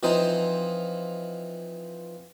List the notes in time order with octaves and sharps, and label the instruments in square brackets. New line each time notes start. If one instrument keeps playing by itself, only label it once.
[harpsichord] E3 F3 C4 D#4 F4 C5